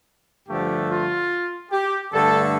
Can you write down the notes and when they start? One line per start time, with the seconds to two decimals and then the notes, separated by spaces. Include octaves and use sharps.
0.49 G2 D3 F3 A3 G4
0.90 F4
1.71 G4
2.12 G2 D3 A3 A4